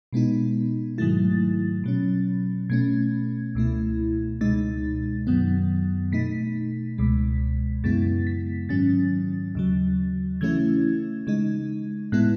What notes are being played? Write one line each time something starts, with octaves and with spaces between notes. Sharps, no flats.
B2 G#3 B3 D#4
G#2 D#3 F#3 A3 E4 A6
B2 F#3 C#4
B2 A3 C#4 G#6
C#2 B2 A3 E4
C#2 B2 G#3 D#4 A6
F#2 D#3 F#3 B3
B2 A3 D#4 B6
C#2 B2 G#3
F#2 C#3 G#3 B3 E4 A6
B6
G#2 D#3 F#3 C#4 A6
D#2 C#3 F#3
C#3 E3 A3 C#4 E4 G#6
C#3 G#3 D#4
A2 G#3 B3 E4 F#6